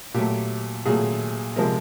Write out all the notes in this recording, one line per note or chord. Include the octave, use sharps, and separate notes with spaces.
A#2 F#3 A3 G4
A#2 F#3 A3 G#4
C3 F3 G#3 A#4